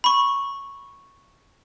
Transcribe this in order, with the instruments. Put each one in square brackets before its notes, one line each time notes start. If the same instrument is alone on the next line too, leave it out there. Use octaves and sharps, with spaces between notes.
[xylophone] B5 C#6